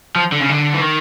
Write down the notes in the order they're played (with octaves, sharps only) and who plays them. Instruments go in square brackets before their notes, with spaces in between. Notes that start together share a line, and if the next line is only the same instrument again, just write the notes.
[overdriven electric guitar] F3
D3
C#3
D3
E3
D#3